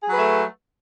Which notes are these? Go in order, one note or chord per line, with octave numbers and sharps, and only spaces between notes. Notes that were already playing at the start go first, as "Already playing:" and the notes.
F#3 A3 G#4 B4